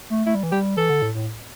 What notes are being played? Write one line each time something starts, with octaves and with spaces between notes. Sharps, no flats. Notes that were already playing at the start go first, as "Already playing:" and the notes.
A3
A3 E4
G3
E3
G3 G4
E3 A4
D3
A2
A2